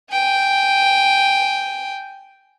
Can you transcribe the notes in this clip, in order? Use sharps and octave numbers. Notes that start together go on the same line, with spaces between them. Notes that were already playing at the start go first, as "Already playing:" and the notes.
G5 G#5